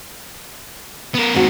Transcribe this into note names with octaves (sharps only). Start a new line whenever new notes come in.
B3 A#4
D#2 D#3 G#3 C4 F#4